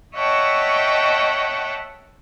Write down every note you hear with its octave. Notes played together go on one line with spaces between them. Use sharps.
C#5 D#5 E5 F#5 G5 A5